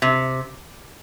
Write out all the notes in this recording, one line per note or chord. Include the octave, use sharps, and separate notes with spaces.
C3